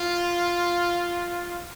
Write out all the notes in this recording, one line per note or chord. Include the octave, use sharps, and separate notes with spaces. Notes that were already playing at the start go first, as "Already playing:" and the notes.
Already playing: F4